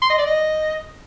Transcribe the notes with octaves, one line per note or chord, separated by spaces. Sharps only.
C6
D#5
D5
D#5